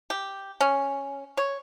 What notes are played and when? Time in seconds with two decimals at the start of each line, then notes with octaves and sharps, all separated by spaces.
0.10 G4
0.61 C#4
1.37 C#5